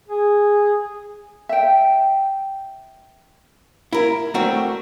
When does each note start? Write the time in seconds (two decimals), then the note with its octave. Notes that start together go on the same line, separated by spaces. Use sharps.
0.09 G#4
1.49 E5 G5
3.93 E4 A#4
4.34 A3 C4 D4 F#4 A#4